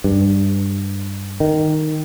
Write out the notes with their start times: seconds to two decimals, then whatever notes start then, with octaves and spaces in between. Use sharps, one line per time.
0.04 G2
1.40 D#3